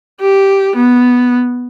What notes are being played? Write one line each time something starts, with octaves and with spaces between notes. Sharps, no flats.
G4
B3